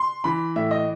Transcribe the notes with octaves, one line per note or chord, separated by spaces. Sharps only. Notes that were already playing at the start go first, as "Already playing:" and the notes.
Already playing: C6
E3 B5
A2 E5
D#5